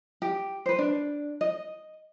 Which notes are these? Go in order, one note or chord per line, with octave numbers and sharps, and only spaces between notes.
G4
B4 C5
D4
D#5